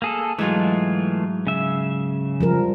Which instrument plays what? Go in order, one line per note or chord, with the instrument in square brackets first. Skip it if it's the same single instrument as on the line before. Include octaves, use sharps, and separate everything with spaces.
[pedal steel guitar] A#3 G#4 A4
[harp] G#2 F#3 D#4 [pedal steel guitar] E3 A3 F4
[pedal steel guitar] C#3 E5
[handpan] F3 G3 A#4